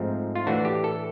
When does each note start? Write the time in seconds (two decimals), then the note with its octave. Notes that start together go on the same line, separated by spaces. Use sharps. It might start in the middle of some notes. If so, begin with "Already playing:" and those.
Already playing: G#2 F3 A3 C4 D#4
0.36 F4
0.47 A2 E3 A3 D4 F#4
0.65 G4
0.84 A4